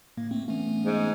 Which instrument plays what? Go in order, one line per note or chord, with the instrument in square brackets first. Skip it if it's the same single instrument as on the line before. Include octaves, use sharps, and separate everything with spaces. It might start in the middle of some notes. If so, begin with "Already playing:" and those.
[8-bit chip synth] A2 [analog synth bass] A#3
[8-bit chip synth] A3 A#3 [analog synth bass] C4
[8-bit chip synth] E3 B3 C#4 [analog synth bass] A3
[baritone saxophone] G#2